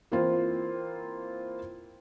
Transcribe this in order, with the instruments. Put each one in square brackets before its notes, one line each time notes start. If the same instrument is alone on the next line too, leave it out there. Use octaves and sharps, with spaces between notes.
[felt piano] E3 A#3 C4 F4